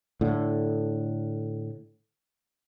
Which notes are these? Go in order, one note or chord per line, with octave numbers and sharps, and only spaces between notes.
A2 D3